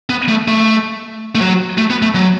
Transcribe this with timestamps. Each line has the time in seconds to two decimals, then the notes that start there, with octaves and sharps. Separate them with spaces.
0.10 B3
0.29 A3
0.48 A3
1.35 A3
1.41 F#3
1.78 A3
1.90 B3
2.02 A3
2.15 F#3